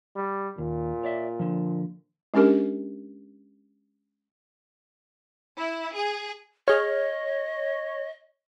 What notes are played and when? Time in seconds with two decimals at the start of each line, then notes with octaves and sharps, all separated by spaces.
0.16 G3
0.58 D#2 A#2
1.03 C#5 D5 E5
1.39 D3 F3
2.34 G#3 C#4 D4 G4 A#4
5.59 E4
5.95 G#4
6.68 G#4 C#5 D#5 F6